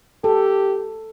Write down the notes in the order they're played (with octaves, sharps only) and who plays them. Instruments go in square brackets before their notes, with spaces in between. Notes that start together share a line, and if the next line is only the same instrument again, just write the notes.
[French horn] G4 [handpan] A4